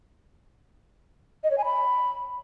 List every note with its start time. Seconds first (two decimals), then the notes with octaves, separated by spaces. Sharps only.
1.44 D#5
1.51 C#5
1.58 G#5
1.65 B5